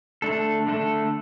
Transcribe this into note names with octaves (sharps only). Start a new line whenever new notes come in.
D3 A3 D4 A4
D3 A3 D4 A4